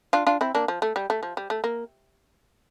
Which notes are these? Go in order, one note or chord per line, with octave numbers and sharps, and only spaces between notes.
D4 F4
D4 F4
C4 E4
A#3 D4
F3
A3
G3
A3
F3
G3
A3
A#3